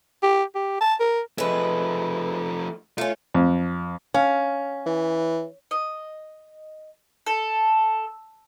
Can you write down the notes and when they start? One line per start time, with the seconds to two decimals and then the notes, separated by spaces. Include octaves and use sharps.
0.23 G4
0.55 G4
0.81 A5
1.00 A#4
1.38 F3 G#3 A3 B4
2.98 A3 C#4 F4
3.34 F2
4.14 C#4 F5
4.86 E3
5.71 D#5
7.26 A4